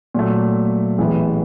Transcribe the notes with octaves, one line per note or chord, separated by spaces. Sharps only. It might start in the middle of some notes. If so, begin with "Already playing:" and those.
A#2 F#3 A3
A1 A2 E3 G#3 B3